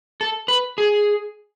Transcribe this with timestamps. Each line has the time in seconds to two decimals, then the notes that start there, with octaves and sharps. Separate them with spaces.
0.21 A4
0.48 B4
0.78 G#4